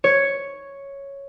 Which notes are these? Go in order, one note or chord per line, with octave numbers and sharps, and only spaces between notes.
C#5